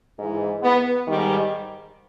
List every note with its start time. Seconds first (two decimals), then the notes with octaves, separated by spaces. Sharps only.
0.18 G#2 E3
0.63 B3
1.07 G#2 D#3 G3